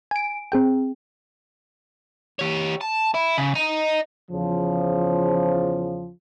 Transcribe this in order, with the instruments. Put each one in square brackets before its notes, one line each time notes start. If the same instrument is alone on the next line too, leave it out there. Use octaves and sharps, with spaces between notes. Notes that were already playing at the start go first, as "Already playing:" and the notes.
[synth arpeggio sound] G#5 D7
C4 G#4 G5
[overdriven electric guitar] G4 C#5
A5
E4
C#3
D#5 A#5
[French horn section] E2 C#3 F3